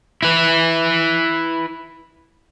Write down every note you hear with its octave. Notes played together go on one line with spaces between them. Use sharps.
E4 B4